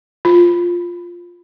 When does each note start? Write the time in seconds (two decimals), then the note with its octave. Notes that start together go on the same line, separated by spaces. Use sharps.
0.25 F4